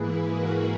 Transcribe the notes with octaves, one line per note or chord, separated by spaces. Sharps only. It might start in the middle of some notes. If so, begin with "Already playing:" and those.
Already playing: G#2 E3 A#3 E4 G#4 B4
F#4 A#4